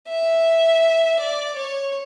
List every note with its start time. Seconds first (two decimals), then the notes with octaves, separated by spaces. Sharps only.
0.09 E5
1.20 D5
1.55 C#5